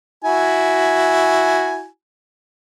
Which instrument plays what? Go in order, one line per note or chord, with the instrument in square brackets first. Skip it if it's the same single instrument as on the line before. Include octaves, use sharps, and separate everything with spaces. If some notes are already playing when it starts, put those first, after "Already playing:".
[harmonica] E4 F#4 G#5